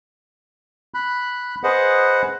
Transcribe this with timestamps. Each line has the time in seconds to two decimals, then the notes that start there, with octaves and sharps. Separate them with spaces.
0.94 B5 F#6
1.64 G#4 B4 C5 D#5 F#5